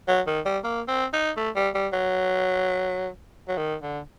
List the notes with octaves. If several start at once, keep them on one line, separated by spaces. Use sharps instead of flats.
F#3
D#3
G3
A#3
C4
D#4
A3
G3
G3
F#3
F#3
D#3
D3